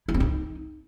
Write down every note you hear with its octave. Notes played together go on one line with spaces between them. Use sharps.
E4
C4
D#4